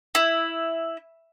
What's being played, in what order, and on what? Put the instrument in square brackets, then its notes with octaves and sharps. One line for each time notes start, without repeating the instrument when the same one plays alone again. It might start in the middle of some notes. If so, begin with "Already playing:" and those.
[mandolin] E4